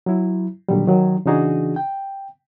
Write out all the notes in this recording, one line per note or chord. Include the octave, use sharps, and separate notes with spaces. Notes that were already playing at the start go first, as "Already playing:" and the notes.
F#3 E4
A#2 D3 D#3 F#3 G3
D#3 F#3
C#3 E3 D4 D#4 F#4 G#4
G5